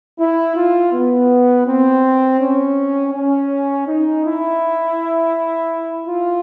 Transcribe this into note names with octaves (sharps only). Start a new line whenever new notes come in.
E4
F4
B3
C4
C#4
C#4
D#4
E4
F4